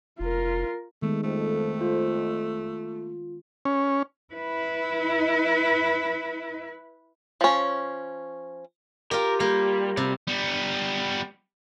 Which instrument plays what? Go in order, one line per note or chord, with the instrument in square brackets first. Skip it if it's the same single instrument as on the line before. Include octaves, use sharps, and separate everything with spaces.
[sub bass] F1 [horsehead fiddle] F4 A#4
[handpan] D#3 G#3 B3 [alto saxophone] A3
[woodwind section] F2 [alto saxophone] A3
[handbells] F4
[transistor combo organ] C#4
[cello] E4 B4
[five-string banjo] F3 C#4
[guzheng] F4 G4 [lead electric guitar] A#4
[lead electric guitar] G3 [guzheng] A#3
[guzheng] C3 [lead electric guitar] G3
[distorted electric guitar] G3 B3